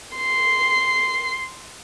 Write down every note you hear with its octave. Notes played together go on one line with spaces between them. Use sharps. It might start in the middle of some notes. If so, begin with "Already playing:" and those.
C6 C7